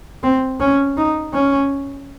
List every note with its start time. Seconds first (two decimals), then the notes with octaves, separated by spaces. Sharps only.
0.23 C4
0.60 C#4
0.97 D#4
1.34 C#4